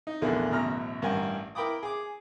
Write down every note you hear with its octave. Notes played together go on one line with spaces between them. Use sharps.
D#4
A#1 E2 D3 E3 A3 A#3
A1 F#2 B2 A#5 F6
A1 G2 A#4 F#5 G#5
E4 A#4 G5 B5 D6 D#6
G#4 D6